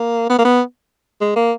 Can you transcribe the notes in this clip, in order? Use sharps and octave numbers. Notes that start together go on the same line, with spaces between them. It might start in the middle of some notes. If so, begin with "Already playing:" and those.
Already playing: A#3
B3
A#3
B3
G#3
A#3